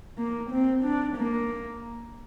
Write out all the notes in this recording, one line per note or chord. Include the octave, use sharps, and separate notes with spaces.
A#3
C4
D4
A#3